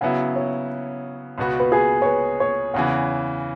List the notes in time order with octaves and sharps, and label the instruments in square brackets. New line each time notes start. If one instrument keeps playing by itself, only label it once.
[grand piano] C#3 F#3 B3 E4 [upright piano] F#5
[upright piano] C#5
[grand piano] C#2 B2 B3 F#4
[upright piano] B4
G#4
C#5
B4
C#5
[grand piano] E2 C#3 E3 [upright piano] F#5